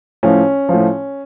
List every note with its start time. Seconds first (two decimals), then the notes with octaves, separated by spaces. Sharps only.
0.23 A2 F3 C#4
0.69 A2 F3